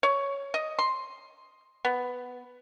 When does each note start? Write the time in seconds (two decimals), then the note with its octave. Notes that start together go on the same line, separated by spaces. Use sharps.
0.03 C#5
0.54 D#5
0.79 C6
1.85 B3